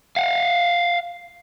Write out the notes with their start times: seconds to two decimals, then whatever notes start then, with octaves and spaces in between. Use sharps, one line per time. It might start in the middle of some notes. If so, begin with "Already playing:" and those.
0.16 F5 F#5